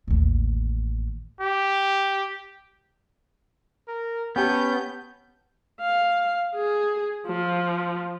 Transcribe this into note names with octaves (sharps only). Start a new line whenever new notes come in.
A1 D#2
G4
A#4
B3 C#4 G4 G5 A5 G6
F5
G#4
F3